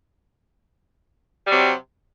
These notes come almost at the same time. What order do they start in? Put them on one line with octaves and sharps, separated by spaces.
G3 F#3 C3